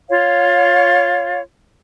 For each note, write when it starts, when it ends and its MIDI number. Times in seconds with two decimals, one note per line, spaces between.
0.08 1.40 65
0.08 1.40 73
0.08 1.40 77